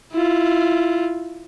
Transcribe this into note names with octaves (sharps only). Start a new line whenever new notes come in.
E4 F4